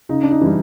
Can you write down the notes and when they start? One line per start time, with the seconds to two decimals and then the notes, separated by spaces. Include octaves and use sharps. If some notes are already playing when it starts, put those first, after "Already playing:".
0.09 C#3 D#4
0.23 D4
0.31 D#4
0.41 E3 G3